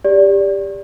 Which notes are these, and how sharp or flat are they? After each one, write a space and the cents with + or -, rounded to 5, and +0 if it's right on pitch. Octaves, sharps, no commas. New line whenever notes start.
G4 +20 D5 -15